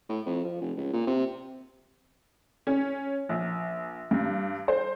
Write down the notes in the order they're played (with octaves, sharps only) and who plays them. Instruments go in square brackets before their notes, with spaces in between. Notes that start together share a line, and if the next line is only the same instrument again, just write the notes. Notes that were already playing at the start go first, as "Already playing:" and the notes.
[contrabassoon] A2
F2
F3
F1
C#2
A#2
C3
[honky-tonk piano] C#4
A#1
G2
C5